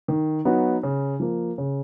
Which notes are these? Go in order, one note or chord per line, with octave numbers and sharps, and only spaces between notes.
D#3
F#3 B3 D#4 F#4
C#3
F3 A#3
C#3